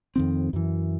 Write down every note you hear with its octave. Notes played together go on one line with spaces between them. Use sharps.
F2 D#3 C4
F#2 E3